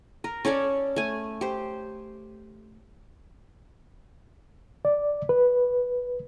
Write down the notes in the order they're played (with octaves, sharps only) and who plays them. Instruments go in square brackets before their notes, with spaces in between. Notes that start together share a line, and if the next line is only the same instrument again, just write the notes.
[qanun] A#4
C#4 A4 C#5 D5
A3 G#5
G4 C5
[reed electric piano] D5
B4